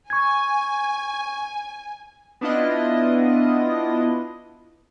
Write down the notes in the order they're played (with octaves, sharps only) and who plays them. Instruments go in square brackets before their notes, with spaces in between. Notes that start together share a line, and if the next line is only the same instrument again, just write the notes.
[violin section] G#5 [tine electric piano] C#6 G#6
[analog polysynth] B3 D4 E4 F4 D#5